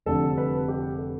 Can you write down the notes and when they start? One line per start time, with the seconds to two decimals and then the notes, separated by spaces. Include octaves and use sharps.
0.06 F1 F2 D3 G3 A4
0.37 B4
0.68 G4
0.98 A4